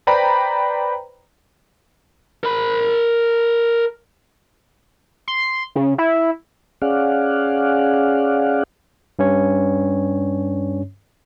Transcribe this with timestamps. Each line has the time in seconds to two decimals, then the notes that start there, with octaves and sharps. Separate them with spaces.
0.07 B4 C5 D5 G5 A#5 B5
2.43 A#4 B5
5.28 C6
5.76 C#3
5.98 E4
6.82 C#4 G#4 D5 F5 F#5
9.19 G2 C#4 C#5